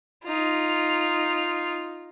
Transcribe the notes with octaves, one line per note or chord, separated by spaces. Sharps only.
D#4 F4